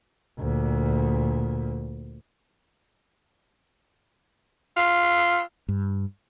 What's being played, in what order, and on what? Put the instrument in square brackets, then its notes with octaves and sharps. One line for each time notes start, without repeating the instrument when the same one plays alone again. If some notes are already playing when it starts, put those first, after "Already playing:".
[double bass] D2 A#2
[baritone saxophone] F4
[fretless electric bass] G2